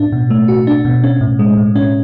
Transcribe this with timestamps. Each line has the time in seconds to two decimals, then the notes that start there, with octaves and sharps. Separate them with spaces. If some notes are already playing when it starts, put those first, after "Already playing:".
Already playing: A2 D4
0.12 B2
0.30 A3
0.48 F#4
0.67 D4
0.85 B2
1.04 C#4
1.21 A2
1.39 G#3
1.57 A2
1.76 C#4